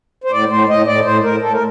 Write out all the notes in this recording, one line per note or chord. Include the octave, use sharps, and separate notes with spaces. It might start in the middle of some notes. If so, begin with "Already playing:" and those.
C5
A2 D5
A2 C5
A2 D#5
A2 D5
A2 C5
A2 A#4
A2 A4
A#4